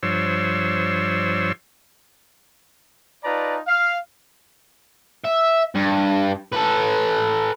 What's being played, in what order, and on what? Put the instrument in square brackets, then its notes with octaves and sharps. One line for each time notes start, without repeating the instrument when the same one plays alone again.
[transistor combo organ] G2 F3 D4 C5 C#5 E6
[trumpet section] D#4 F4 B4 D5 A5 A#5
F5
[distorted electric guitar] E5
G2
A4 B4